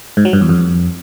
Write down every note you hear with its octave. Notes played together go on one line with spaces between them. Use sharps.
G#2
F#3
G2
E2
F2